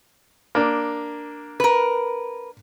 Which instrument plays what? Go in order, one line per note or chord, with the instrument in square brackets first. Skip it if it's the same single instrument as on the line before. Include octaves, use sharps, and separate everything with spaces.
[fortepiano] A#3 D4
[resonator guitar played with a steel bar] A#4 B4